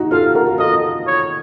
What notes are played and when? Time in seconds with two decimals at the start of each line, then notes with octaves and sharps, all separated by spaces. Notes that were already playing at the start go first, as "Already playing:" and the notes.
Already playing: D#4 F#4
0.11 F4 A4 F5
0.35 F#4 A#4
0.58 F4 A4 D#5
1.07 C#5